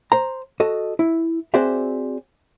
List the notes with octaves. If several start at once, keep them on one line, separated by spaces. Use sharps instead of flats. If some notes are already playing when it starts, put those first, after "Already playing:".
C5 A#5
F#4 A4 D#5
E4
C4 F#4 G#4 C5 D5 E5